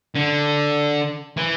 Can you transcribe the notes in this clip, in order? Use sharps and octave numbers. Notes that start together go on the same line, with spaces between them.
D3
E3